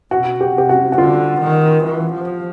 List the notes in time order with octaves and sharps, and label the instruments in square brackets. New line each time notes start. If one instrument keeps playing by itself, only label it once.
[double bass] B2 [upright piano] F#4
[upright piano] G4
[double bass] C3 [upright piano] G4
[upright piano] F#4
F#4
[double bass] D3 [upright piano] F4
[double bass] D#3
E3
F3